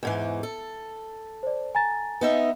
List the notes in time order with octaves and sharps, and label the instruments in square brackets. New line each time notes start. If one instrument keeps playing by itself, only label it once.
[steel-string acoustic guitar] E2 G#2 E3
A4
[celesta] C5 D5
G#5 A#5 A6
[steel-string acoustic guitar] B3 D#4 E5